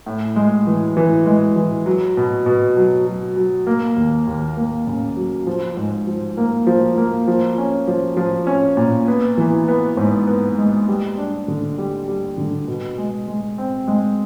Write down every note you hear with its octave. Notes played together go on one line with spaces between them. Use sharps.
A2
G#3
E3
E3
G#3
E3
F#3
B2
B2
F#3
F#3
F#3
A#3
D#2
D#2
A#3
C#3
F#3
F3
G#2
F3
A#3
F3
A#3
F3
C#4
F3
F3
C#4
A#2
B3
E3
B3
G#2
B3
G#3
G3
D4
D3
G3
G3
D3
B2
G#3
G#3
C4
G#3